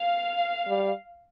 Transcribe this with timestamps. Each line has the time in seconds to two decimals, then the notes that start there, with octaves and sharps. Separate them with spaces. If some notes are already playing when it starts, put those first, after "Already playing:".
Already playing: F5
0.67 G3